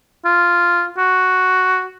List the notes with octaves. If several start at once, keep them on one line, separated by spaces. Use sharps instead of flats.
F4
F#4